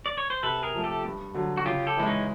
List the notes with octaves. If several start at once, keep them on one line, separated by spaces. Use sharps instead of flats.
D5
C#5
C5
C3 A4 B4
G#4 A#4
F3 A3
G4 A4
G2
D3 F#3
F#4
C#3 F4 G4
G4 A4
E3 G#3
C#4 D#4